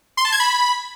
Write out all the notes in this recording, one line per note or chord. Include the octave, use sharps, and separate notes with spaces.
C6
A5
G#6
B5